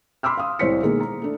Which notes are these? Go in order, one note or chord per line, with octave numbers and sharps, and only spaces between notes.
B5 C6 D6 E6 F6
F5 C6 D#6
C2 A2 C5 C#5 B6 C#7
B2 D#3 G#3 A#3
A#5
A3 D4